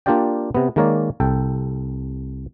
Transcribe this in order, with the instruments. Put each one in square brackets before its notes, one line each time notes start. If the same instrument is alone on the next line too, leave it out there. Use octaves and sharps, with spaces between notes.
[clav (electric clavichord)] A#3 D4 F4 G4 D5 G5
C3 B3
D#3 G#3 A#3 A#4 C#5 D5
C2 A4 G5